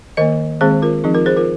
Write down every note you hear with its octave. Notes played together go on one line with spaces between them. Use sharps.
D#3 A#3 A#4 D#5
D#3 G#3 C4 G#4 C5
F4 A#4
F3 C4 D#4 G#4
F4 A#4
G#4 C5
F4 A#4